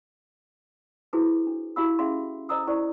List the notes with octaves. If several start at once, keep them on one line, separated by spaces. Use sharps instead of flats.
E4 F#4 G#4 A4 B4 C5
D4
E4 F#4 G4 F5 B5 E6
C#4 G#4 E5 F5 C6
A4 C5 D#5 A#5 D#6 E6
E4 A4 C5 D5 C#6